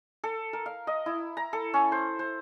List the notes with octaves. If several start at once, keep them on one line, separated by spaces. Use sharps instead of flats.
A4
A#4
F5
D#5
E4
A#5
A4
C#4
C5
C5